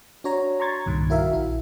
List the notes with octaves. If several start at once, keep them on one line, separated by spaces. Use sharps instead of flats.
D4 F#4 C#5 A#5
A#5 C6 C#6 G#6 A6
C2 G2 A#2 D#3 G#6
E4 F#4 A#4 E5 F5
A#1 E4